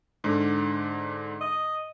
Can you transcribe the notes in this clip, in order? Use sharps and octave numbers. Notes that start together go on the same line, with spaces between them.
G#2 D3
D#5